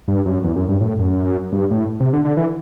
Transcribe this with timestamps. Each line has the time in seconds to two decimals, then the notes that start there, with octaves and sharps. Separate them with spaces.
0.08 G2
0.26 F#2
0.43 E2
0.56 F#2
0.68 G2
0.81 A2
0.99 F#2
1.52 G2
1.71 A2
2.00 C3
2.13 D3
2.25 D3
2.37 E3